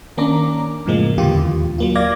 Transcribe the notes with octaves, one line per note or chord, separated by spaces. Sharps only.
D#3 A#3 C#4 D4 A#5 D6
F#2 A2 C#3 F3 G#3 A#3
E2 A#2 D3 E3 F4 G4
D#2
F#3 A#3 F4
D5 F5 D6 G#6 A#6